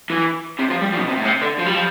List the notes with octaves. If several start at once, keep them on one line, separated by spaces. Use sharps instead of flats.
E3
C3
F3
G3
F3
B2
C3
A2
C3
D3
F3
G3
F3